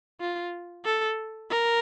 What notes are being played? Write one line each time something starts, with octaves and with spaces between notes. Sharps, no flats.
F4
A4
A#4